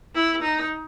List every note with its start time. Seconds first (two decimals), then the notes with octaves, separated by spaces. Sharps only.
0.15 E4
0.43 D#4